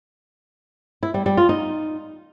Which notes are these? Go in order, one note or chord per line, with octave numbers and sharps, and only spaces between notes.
E4
G3
G3
F4
D#4